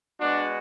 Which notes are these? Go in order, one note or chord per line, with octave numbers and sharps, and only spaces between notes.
G#3 B3 D4 F#4 D5